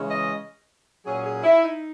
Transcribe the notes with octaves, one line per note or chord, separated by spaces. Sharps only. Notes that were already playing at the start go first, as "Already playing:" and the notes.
Already playing: C#3 E3 G#3 C#4
D#5
A#2 F#3 C#4 G#4
G#4
E4
D#4